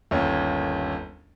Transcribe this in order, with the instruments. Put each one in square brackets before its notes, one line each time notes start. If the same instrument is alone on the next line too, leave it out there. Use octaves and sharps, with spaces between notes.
[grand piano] G1 D#2 C#4